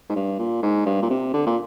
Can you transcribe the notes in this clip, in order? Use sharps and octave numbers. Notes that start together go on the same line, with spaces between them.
G#2
G2
A#2
G#2
G2
A#2
C3
D3
A#2